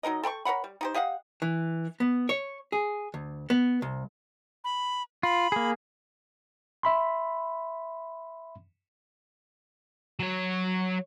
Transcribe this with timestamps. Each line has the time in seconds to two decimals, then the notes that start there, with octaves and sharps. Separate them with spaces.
0.03 F#3 D#4 A#4 D#5
0.23 A4 G5 B5 C#6
0.45 A#4 C#5 F#5 B5
0.64 G3
0.81 D#4 G4 C5
0.94 G4 D#5 F5 F#5
1.42 E3
2.00 B3
2.29 C#5
2.72 G#4
3.14 D2
3.50 B3
3.82 C2
4.64 B5
5.23 F4 B5
5.52 A#3 G#4
6.83 E5 B5 C6
10.20 F#3 C#5